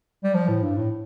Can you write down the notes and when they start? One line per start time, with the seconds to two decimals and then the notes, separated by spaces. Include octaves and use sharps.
0.24 G3
0.34 F3
0.48 A2
0.62 G2
0.76 A2